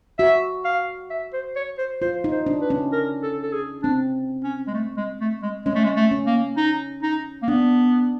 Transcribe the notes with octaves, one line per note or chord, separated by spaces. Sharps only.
F#4 E5
F5
E5
C5
C#5
C5
F4 C5
D#4
C5
D4
B4
C#4
A#4
A4
A4
G#4
C4 D4
C#4
G#3
A3
G#3
A3
G#3
G#3 C#4
A3
G#3
A3
C#4
A#3
D#4
D#4
A#3
B3 D4